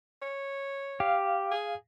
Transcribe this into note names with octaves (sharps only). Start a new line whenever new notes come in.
C#5
G4 F5
G#4